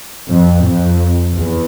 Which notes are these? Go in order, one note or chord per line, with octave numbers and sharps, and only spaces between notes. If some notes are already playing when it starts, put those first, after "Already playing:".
F2
F2
E2